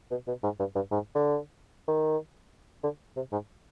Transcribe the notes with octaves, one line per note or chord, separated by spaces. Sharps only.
B2
B2
G#2
G2
G2
G#2
D3
D#3
D3
C3
G#2